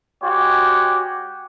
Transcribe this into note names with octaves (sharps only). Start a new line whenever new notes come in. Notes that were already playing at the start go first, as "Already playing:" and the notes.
G#3 F#4 G4 C#5